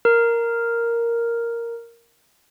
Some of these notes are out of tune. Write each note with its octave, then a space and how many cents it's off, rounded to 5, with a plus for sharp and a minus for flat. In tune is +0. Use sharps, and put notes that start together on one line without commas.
A#4 +0